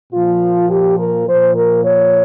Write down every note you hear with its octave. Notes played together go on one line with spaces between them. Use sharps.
A#2 F3 F4
G4
A#4
A#2 F3 C5
A#4
C#5